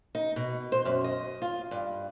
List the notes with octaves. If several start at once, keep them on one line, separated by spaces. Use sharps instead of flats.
D#4
B2
C5
F#2
D#5
F4
G2